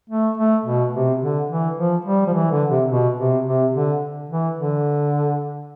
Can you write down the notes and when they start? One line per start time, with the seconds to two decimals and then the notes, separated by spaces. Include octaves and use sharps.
0.10 A3
0.37 A3
0.65 B2
0.93 C3
1.21 D3
1.50 E3
1.77 F3
2.05 G3
2.26 F3
2.33 E3
2.51 D3
2.70 C3
2.89 B2
3.18 C3
3.46 C3
3.74 D3
4.30 E3
4.57 D3